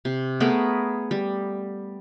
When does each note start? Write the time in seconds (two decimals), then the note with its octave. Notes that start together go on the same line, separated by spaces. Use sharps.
0.05 C3
0.40 A3 B3 G#4 A#4
1.11 G3